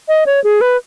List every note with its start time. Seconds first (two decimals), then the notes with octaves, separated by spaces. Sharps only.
0.08 D#5
0.26 C#5
0.44 G#4
0.61 B4